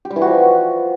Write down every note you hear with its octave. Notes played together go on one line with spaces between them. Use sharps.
G4
G3
E3
F#4
F3